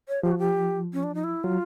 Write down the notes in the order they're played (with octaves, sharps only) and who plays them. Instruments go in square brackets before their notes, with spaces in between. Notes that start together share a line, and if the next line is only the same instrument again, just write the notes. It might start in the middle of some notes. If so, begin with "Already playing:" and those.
[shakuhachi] C#5
[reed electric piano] F3 [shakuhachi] G4
[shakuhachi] F#4
G4
C#4
D4
D#4
E4
[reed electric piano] F#3 [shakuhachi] F4